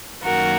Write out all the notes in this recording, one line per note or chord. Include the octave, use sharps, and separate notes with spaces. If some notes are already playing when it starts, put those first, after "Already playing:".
F#2 D#3 F#3 A#3 F#4 A#4